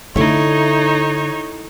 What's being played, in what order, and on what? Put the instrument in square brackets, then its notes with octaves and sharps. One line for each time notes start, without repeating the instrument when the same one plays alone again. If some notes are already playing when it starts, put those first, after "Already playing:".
[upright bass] D3 [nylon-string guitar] A3 E4 [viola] D#4 C#5